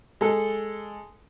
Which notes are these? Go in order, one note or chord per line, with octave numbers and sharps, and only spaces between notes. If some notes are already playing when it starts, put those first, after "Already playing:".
G#3 A4